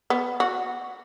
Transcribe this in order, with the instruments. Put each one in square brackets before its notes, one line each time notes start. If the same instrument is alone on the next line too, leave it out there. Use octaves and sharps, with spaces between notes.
[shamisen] B3
F#4